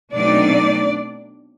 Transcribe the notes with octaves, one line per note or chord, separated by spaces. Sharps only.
B2 F#3 A3 C4 D4 D#4 D5